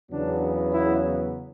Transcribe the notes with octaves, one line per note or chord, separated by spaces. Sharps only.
E2 C#3 F#3 B3 D4
E4